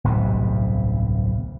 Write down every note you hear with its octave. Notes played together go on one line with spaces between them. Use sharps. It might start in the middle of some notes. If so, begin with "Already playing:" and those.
D1 B1 G2 C3